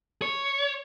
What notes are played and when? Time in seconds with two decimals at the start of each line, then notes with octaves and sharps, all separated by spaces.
0.22 C#5